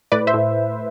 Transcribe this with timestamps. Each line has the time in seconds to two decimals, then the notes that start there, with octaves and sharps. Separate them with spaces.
0.12 A2 B4 D5
0.27 C5 E5
0.34 A2